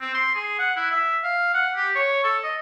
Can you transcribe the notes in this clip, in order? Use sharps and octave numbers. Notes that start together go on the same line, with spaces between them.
C4
C6
G#4
F#5
E4
E5
F5
F#5
G4
C#5
A4
D#5